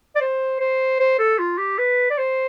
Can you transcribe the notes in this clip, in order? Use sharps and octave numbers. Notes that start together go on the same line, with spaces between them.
D5
C5
C5
C5
A4
F4
G4
B4
D5
C5